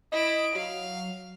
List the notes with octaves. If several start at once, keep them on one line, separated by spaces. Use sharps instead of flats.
E4 D#5 D7
F#3 F5